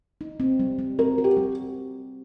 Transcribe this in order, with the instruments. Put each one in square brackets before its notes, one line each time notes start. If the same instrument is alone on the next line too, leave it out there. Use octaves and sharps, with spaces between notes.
[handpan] D#4
C4
G3
G3
[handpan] C4 [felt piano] A#4
[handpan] F#4
[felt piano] G4
[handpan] G3